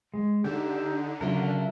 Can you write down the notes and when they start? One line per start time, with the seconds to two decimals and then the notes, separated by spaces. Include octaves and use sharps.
0.14 G#3
0.44 D3 D#4 G4 E5
1.21 C#3 F#3 D4 F4 A#4 E5